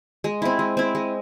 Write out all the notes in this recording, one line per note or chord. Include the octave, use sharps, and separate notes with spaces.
G#3
C4 E4
G#3
C4 E4
G#3